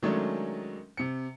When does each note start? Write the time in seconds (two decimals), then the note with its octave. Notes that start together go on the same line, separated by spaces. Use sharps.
0.03 D#3 F#3 G#3 A3 C#4 D4
0.97 C3 C#7